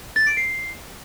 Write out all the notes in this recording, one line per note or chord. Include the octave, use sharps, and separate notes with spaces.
A6
D7
C7